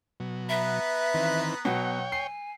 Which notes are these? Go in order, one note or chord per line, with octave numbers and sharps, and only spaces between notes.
B2 F#3
B3 B4 E5 A#5
D#3 E3 C4
B2 F#3 C#5 F#5 G5
G#5 C7